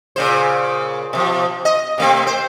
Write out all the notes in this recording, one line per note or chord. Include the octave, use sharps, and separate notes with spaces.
A#2 C#3 C5
B2 F3
D#5
C3 A3 C4
C5